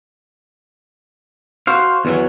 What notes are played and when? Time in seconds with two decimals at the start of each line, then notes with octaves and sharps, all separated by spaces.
1.67 F#4 C5 F5
2.05 E2 E3 F#3